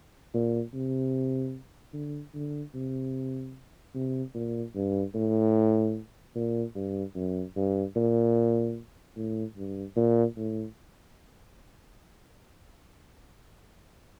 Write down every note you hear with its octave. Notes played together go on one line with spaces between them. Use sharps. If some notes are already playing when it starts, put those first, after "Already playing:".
A#2
C3
D3
D3
C3
C3
A#2
G2
A2
A#2
G2
F#2
G2
A#2
A2
G2
A#2
A2